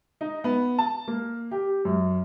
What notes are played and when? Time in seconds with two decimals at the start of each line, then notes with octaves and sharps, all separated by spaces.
0.21 D#4
0.44 B3
0.78 A5
1.08 A#3
1.51 G4
1.85 F#2